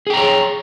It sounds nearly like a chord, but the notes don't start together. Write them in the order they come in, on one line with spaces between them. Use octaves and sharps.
G#4 G5 A#5 C#5